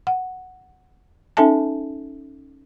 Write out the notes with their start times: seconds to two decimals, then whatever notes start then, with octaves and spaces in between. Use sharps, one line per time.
0.07 F#5
1.37 C#4 D#4 A4 E5 G#5 A5